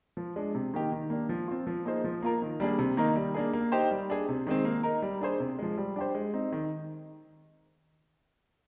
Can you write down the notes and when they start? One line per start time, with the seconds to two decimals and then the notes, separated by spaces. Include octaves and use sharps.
0.17 F3
0.36 G#3 D4
0.55 C3
0.74 D#3 A#3 D#4 G4
0.92 D#3
1.10 A#3 D4
1.29 F3
1.48 C4 F4
1.67 F3
1.85 A#3 D#4 G#4 C5
2.04 F3
2.23 A#3 F4 A#4
2.42 D#3
2.60 G3 A#3 D4 G#4
2.79 C3
2.97 D#3 A#3 D#4 A#4
3.16 G3
3.34 A#3 D4 G#4
3.53 A#3
3.72 D#4 G4 C5
3.91 G3
4.10 D4 G#4
4.29 C3
4.47 D#3 G#3 C4
4.65 A#3
4.83 D#4 A#4
5.02 G3
5.21 D4 G#4 C5
5.40 C3
5.59 F3 G#3
5.78 G3
5.96 D4 G4 C5
6.15 G#3
6.33 C4 D#4
6.52 D#3